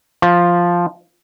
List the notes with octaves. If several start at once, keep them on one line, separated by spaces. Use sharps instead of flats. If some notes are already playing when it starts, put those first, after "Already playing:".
F3